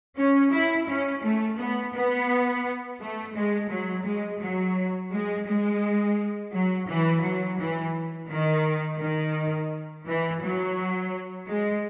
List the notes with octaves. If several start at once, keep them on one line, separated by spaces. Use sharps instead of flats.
C#4
E4
C#4
A3
B3
B3
A3
G#3
F#3
G#3
F#3
G#3
G#3
F#3
E3
F#3
E3
D#3
D#3
E3
F#3
G#3